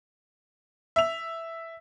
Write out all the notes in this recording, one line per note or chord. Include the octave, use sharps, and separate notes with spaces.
E5 F7